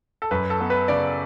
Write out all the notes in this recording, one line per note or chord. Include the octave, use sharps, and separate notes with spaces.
A4
F#2 B4
A4
B3
B4
C#3 D5